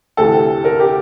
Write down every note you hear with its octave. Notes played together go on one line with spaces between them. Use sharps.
D2 C3 E3 A4
A#4
G4